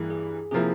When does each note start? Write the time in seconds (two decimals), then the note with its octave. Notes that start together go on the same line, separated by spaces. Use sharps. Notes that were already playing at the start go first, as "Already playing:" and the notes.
Already playing: G2 E3 A#3 G#4
0.10 G#4
0.51 C3 F3 A#3 E4 G#4